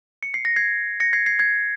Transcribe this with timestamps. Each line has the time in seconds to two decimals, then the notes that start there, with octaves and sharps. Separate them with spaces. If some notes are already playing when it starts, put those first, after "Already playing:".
0.23 C#7
0.34 C7
0.45 A#6
0.56 G#6 C7
1.00 A#6 C#7
1.13 G#6 C7
1.26 G#6 C7
1.39 G#6 C7